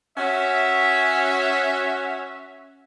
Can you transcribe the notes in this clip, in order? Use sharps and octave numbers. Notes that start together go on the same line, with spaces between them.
C#4 F#4 E5